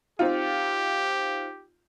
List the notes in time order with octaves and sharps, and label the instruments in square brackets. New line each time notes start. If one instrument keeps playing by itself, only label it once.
[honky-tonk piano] C4 D#4 F4 [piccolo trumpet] G4